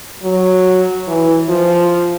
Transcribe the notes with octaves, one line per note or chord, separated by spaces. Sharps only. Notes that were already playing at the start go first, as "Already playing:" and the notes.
F#3
E3
F3